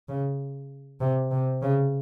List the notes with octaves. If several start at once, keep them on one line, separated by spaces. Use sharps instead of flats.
C#3
C3
C3
C#3